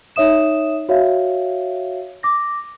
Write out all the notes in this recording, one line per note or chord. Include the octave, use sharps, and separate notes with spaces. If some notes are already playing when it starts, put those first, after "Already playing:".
D#4 C#5 E5 D#6 E7
F#4 C#5 E5 F5
D6 A#6